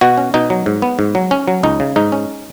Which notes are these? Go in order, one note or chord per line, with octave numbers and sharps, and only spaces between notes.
B2 F#4
C#4
B2 D#4
F#3
G#2
B3
G#2
F#3
C#4
F#3
C#2 D#4
C#3
G#2 D#4
C#4